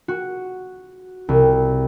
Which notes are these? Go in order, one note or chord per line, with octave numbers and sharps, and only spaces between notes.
F#4
C2